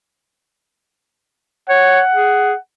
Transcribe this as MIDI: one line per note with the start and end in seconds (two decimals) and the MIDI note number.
1.69 2.01 73
1.69 2.58 78
2.13 2.53 68